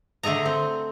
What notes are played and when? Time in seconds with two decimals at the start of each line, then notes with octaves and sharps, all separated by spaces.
0.23 D3 A3 A4 D#5 A#5
0.45 C4